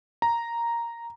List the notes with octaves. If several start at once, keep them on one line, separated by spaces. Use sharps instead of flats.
A#5